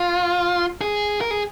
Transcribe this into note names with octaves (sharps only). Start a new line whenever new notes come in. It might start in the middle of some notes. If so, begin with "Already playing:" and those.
Already playing: F4
G#4
A#4
G#4